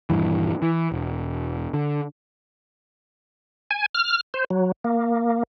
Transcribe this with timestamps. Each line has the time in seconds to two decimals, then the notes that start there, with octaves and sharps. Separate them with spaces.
0.10 D#1 A#1 G2 E3
0.62 E3
0.92 E1
1.73 D3
3.71 G#5
3.95 F6
4.34 C5
4.50 F#3
4.84 A#3